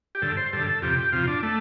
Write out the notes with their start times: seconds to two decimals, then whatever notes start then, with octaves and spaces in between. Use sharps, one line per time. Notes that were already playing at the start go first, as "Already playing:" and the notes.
0.15 G4
0.22 G2 D3 A4
0.37 C5
0.53 G2 D3 A4
0.67 A4
0.82 F2 C3 G4
1.12 F2 C3 F4
1.27 D4
1.43 A3